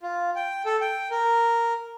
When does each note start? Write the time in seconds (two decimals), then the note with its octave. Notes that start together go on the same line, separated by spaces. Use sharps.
0.03 F4
0.36 G5
0.66 A4
0.81 G5
1.11 A#4